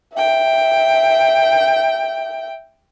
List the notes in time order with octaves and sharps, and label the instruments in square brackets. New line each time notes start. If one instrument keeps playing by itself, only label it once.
[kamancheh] E5 G5